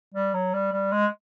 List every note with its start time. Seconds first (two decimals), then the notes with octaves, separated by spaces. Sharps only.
0.14 G3
0.34 F#3
0.54 G3
0.73 G3
0.92 G#3